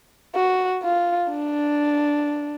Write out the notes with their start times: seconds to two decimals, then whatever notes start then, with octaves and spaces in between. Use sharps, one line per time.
0.35 F#4
0.83 F4
1.31 D4